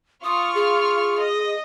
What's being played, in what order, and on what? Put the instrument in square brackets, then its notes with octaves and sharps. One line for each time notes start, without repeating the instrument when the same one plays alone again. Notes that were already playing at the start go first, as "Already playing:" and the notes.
[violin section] F4 C#6 F6 [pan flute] D#6
[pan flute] G#4
[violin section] D#5